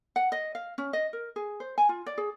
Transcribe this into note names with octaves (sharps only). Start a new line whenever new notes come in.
F#5
D#5
F5
C#4
D#5
A#4
G#4
C5
G#5
F4
D5
G#4